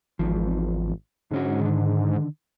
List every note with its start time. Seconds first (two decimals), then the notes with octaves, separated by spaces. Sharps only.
0.19 G#1 E2 F3
1.31 G#2 D3 C#4 F#4
1.61 D3 D#3